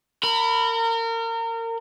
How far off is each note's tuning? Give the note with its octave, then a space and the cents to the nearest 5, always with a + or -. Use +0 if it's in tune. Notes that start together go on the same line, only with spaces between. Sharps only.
A#4 -30 B5 +0